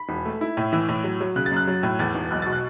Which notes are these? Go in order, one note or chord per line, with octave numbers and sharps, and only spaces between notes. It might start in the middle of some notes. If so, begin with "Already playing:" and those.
Already playing: B5
E1
A3
E4
A2
E3 E6
A2
F#3
F#3
C#3 F#6
A6
F#2 F#6
F#3
A2
E2 A6
E1
B1 F#6
B2 A6
F#6